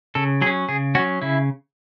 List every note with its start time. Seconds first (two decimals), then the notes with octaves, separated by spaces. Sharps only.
0.15 C#3 A4
0.41 F#3 G#4
0.46 C#4
0.69 C#3 G#4
0.95 C#4 F#4
0.99 F#3
1.22 C#3 E4